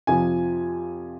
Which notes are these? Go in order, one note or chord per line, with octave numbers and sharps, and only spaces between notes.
F2 C3 F3 G#5